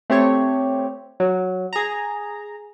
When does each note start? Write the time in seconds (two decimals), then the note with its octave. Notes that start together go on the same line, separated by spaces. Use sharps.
0.10 A3 C4 G4 C#5
1.20 F#3
1.73 G#4 A#5